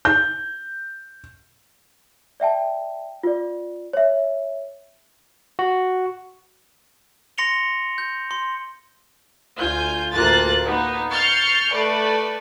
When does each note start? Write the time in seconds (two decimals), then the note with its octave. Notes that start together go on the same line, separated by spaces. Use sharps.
0.05 G6
2.40 D5 E5 G5 A5
3.24 F4 D5
3.93 C#5 E5
5.59 F#4
7.38 C6 A#6 C#7 F7 G7
7.98 G6
8.31 C6
9.59 D2 F4 G#5 G6
10.13 A1 D2 A#3 F4 F#6 A6
10.65 A#3 B3 D#4
11.12 C#6 F6 G6 A6 C7 C#7
11.73 A3 B4 D5